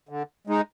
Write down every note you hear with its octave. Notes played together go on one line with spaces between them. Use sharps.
D3
G#3 D#4